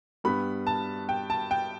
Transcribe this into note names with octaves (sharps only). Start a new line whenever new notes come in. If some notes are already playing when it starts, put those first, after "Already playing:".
G2 G3 B3 B5
A5
G5
A5
G5